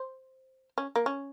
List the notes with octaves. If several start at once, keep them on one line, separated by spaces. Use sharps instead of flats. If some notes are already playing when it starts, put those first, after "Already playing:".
Already playing: C5
C#4
A#3
C#4